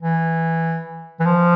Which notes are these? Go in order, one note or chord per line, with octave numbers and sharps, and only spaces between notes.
E3
E3
F3